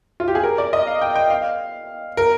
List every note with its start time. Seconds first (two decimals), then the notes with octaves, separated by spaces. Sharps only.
0.20 F4
0.28 G4
0.35 G#4
0.43 A#4
0.58 D5
0.73 D#5
0.87 F5
1.01 G5
1.15 G5
1.30 F5
2.17 A#4